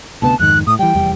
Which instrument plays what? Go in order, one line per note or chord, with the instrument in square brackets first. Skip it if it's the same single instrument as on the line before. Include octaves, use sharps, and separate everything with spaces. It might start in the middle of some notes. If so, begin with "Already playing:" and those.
[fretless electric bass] D2 C3 B3 [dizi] A5
[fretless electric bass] F2 G#2 D#3 [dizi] F#6
[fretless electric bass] A2 [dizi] D#6
[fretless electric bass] E3 G3 [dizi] G5
[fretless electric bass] F1 E2 G3